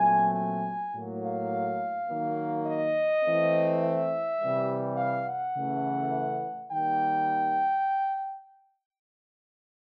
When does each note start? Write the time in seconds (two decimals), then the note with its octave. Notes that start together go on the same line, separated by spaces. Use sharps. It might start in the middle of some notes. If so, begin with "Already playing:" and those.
Already playing: A#2 F#3 A3 C4 G#5
0.35 G#5
0.93 A2 F#3 A#3
1.21 F5
2.08 D#3 F#3 A#3
2.66 D#5
3.24 E3 A3 C4
3.82 E5
4.39 C3 E3 G3
4.97 F5
5.26 F#5
5.55 C#3 E3 A3
6.70 D#3 G3 A#3 G5